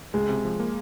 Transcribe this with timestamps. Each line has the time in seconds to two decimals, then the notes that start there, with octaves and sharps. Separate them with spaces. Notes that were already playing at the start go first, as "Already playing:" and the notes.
0.14 C#2 G#3
0.29 C3
0.45 F3
0.60 A#3